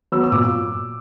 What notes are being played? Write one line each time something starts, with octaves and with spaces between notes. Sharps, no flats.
F#3 B3 E6
E6
A#2 D6